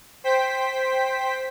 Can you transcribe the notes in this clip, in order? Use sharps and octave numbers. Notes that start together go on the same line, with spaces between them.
C5 G5 B6